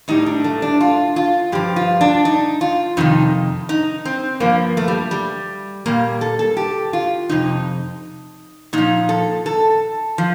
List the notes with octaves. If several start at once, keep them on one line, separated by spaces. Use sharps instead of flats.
A2 G3 D#4
D4
A3
D4
F4
F4
G2 F3 G4
F4
D4
D#4
F4
F2 C3 D#3 D#4
D#4
C4
G2 F3 A#3
A3
G3
G3
A#2 G3 A#3
A4
A4
G4
F4
F2 C3 D#4
A#2 F3 D#4
A4
A4
F3